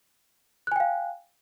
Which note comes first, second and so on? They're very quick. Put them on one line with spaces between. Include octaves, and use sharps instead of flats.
F#6 G#5 G5 F5